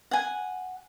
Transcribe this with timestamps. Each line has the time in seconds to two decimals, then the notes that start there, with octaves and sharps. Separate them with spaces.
0.11 F#5 G#5